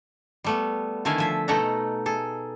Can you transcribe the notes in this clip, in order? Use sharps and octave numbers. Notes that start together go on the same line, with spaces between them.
G3 A3 B3
D3 D#3 A3 E4 F5 G#5
F3 E5
B2 A3 D#4 A4 F#5 A#5
G#4 A4